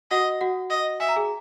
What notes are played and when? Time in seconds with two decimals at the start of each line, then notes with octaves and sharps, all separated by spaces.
0.11 F#4 D#5 F#5
0.41 F#4 F#5
0.70 D#5
1.00 E5 G#5
1.09 A#5
1.16 G#4 G#5